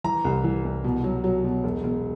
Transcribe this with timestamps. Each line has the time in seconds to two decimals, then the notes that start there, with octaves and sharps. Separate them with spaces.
0.04 E3 A#5
0.25 C2
0.44 E3
0.64 C2
0.84 B2
1.04 F#3
1.24 F#3
1.44 B2
1.64 E1
1.84 E1